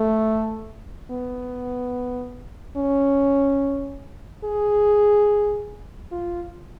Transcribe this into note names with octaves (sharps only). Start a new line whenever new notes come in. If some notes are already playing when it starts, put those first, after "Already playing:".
Already playing: A3
B3
C#4
G#4
F4